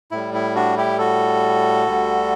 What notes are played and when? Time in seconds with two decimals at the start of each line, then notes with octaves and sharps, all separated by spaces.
0.11 A2 G3 E4
0.34 E4
0.55 D4 F#4
0.77 E4 G4
0.99 F#4 A4
1.87 D2 D3 G3